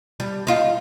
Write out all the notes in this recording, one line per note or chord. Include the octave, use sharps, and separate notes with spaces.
G3
D#4 F4